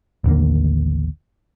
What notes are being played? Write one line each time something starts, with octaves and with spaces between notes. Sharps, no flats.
A1 D#2 D3 A#3